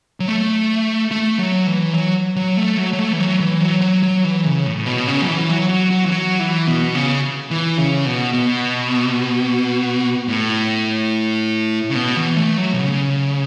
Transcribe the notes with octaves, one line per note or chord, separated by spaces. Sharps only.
F#3
A3
A3
F#3
E3
F#3
F#3
A3
F#3
F#3
A3
E3
F#3
E3
F#3
F#3
F#3
E3
C#3
A2
B2
C#3
F#3
E3
F#3
F#3
F#3
E3
F#3
E3
B2
C#3
E3
C#3
B2
B2
A2
C#3
B2
E3
A3
F#3
B2
C#3